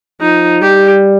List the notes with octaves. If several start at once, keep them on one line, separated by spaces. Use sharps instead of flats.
F3 D#4
G3 G4